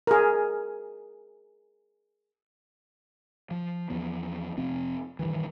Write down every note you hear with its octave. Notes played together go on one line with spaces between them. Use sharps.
G#4 A#4
F3
E2 F3 B3
F1 C3 F3 C4
D#1 G2 D#3 E3